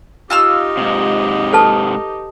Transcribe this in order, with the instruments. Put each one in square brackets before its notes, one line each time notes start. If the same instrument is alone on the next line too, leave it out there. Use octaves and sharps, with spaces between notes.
[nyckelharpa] D#4 G4 [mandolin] F4 E6 F6
[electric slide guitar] G#2 C3
[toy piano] A4 B4 A5